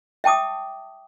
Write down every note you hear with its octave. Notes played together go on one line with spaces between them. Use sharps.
E5 G5 A5 D6 D#6